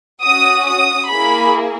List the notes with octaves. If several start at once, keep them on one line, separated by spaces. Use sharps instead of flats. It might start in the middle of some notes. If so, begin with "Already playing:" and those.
C#4 F#4 D#6
D#6
A#3 E4 G#4 B5